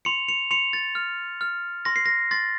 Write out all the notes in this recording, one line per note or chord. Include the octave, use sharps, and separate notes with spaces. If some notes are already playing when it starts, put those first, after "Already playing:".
C6 C#7 F7
C#7 F7
C6 C#7 F7
A6
F6
F6
C6 A#6
C7
A#6
C6 A6